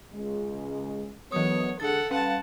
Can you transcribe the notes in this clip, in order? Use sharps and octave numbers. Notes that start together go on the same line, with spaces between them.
C#2 G#3
E3 F#3 A3 B3 C#5 D#6
D3 G#3 G#4 A4 F#5 A6
G3 C#4 B4 F5 F#5 A5